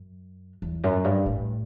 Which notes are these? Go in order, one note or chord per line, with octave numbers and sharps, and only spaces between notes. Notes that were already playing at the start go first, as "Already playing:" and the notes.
Already playing: F#2
E2
F#2
G2
A2